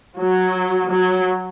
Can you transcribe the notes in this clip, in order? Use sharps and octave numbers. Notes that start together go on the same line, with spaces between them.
F#3
F#3